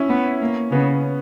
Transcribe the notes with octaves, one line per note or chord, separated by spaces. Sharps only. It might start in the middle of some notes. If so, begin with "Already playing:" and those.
Already playing: C#4 E4
B3
A#3
C#3 B3